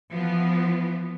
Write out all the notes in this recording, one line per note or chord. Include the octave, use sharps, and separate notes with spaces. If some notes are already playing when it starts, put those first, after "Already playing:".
E3 F3 B3